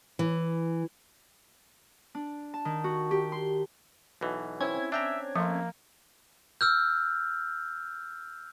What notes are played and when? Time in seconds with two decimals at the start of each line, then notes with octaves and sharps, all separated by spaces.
0.19 E3
2.15 D4
2.54 A5
2.65 D#3
2.84 F#4
3.11 G4
3.32 C6
4.21 B1 B2 E3
4.61 C4 C#4 E4 G#6
4.92 D4 E5 G5 A#5
5.36 F3 A3 A#3 C6
6.61 E6 F6 G6